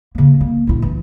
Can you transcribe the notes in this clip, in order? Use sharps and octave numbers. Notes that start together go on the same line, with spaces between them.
C#3 A#3
A#3
A#1 E4
E3